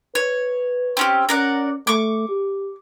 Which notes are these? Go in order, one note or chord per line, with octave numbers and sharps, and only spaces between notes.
B4 C#5
C4 C#4 G4
C#4 A#4 D5 F#5
A3 C#6 D6
G4